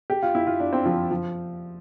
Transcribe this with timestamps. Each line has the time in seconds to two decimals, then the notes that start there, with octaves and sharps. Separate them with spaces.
0.10 G4
0.23 F4
0.35 E4
0.47 F4
0.60 D4
0.73 C4
0.86 F3
1.11 F3